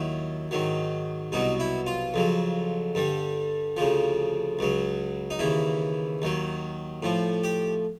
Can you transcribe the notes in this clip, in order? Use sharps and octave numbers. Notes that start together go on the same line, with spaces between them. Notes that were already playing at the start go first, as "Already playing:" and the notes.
Already playing: D#2 D#3 F#3 E4
G#2 D#3 F#3
C2 B2 F#3 D#4
E4
F4
F2 C#3 F#3
G2 D3 G3
D2 C#3 F3
C#2 C#3 F#3
D#4
D#2 C#3 E3 E4
D#2 D#3 F#3
A2 F3
G4